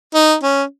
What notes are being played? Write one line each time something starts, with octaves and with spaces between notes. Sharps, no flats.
D#4
C#4